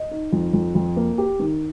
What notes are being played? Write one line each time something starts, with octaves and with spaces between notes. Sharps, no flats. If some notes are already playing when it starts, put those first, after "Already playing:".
Already playing: D#5
D#4
F2
F2
F2
A#3
G4
D#3